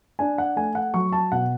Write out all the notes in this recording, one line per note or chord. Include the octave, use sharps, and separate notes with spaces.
D4 G#5
F#5
A3 G#5
F#5
F#3 C#6
A5
B2 F#5